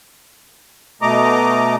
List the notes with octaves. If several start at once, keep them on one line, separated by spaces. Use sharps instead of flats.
B2 A3 D#5 A#5 D6